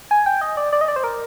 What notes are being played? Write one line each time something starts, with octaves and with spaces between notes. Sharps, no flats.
G#5
G5
D#5
D5
D5
D#5
D5
C5
A#4